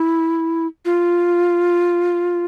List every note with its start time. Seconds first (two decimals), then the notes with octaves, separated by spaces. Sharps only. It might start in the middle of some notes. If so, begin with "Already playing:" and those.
Already playing: E4
0.85 F4